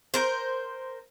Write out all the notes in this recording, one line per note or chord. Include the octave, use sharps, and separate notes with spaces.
A#4 C5